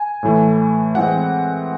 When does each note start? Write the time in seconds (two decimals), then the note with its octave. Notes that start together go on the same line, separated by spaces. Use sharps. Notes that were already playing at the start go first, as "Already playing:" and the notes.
Already playing: G#5
0.23 A2 E3 A3
0.95 E3 G#3 C4 F#5